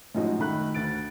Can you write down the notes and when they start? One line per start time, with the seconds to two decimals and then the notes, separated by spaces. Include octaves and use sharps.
0.15 F#2 A2 F3 G#3 D#4 F#4
0.39 D#3 A3 B5 F#6
0.74 D2 A6 D7